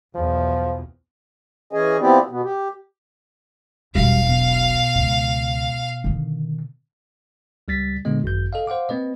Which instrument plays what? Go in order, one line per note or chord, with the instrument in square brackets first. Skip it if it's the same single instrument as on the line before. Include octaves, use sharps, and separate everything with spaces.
[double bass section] B1 E2 [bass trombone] F3
[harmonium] E3 C#4 G#4 D#5 G#5
F3 B3 C4 E4 G4 D5
B2 B3
G4
[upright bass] E1 B1 [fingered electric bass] G3 [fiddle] F5
[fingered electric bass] B2
[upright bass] C#2
D3 D#3
[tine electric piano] C#2 G3 A6 B6
A#2 D3 G#3 B3 D#5
G#1 F#2 G6
A4 D#5 F5
C5 F5 F#5 D6
A#3 C4 B4 D#5